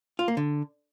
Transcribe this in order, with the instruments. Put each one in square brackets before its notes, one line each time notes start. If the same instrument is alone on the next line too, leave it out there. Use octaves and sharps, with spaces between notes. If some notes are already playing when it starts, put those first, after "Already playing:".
[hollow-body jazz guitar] F4
A#3
D3